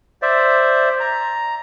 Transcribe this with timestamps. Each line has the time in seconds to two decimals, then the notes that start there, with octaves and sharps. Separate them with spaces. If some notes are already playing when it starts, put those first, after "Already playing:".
0.22 C5 D5 E5
1.00 A#5